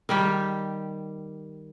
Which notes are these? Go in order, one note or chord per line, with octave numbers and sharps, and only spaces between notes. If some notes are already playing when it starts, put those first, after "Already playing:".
D#3 G3 G4